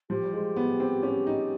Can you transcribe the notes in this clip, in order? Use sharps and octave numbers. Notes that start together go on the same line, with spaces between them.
F3 G4
G3
G#3
B3
C4
C#4
D#4